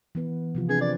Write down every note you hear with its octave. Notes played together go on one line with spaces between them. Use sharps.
E3 B3 B4
C3 F3 F4
C4 D4 G#4 B4
D5